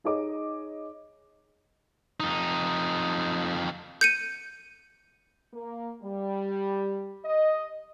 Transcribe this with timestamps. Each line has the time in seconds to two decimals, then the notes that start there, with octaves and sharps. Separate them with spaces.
0.04 D#4 G#4 C#5 D#5 D6
2.20 F2 D#4
4.01 G6 C#7 D#7
5.53 A#3
6.02 G3
7.25 D#5